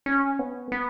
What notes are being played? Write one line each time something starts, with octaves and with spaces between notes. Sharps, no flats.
C#4
B3
B3